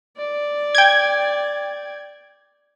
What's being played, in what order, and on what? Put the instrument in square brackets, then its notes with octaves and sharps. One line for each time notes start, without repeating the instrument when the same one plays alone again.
[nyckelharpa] D5
[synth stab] G5 G#6